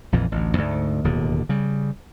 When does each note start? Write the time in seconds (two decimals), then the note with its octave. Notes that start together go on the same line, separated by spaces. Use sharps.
0.12 A#1 F2 A#2 E3
0.32 A1 D2
0.58 D2 G#2
1.04 D1 D#2 B2 D3
1.49 C#3 G3